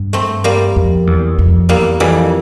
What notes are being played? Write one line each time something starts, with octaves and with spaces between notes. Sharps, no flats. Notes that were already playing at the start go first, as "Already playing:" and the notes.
Already playing: G2
A3 C4
G3 A#3
F2
E2
F2
E2 G3 A#3
F2 E3 G3